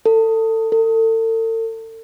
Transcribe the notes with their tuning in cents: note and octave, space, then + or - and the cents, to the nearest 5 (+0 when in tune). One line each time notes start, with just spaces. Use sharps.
A4 +25
A4 +40